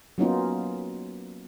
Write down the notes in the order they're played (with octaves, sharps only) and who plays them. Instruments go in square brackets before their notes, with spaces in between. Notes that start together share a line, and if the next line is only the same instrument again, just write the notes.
[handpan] F#3 A#3 B3 C#4 D#4 F4